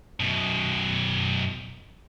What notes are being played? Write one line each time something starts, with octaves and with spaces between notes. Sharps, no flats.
F#2 B2